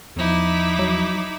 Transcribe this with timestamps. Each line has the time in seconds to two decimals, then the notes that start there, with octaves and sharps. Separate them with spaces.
0.16 E2 F3 D#4 E4 D6
0.79 F#3